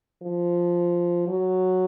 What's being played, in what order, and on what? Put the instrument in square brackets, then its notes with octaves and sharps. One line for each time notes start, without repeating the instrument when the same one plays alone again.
[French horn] F3
F#3